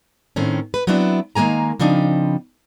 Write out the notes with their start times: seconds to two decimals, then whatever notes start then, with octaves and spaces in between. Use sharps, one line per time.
0.36 A2 D#3 C4 C#4
0.74 B4
0.87 F#3 B3 C4 D4 E4
1.35 D#3 G#3 A#3 G#5 A#5
1.79 C#3 F3 C4 D4 D#4